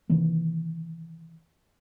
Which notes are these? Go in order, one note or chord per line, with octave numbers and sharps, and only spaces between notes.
C3 D#3 E3 A#3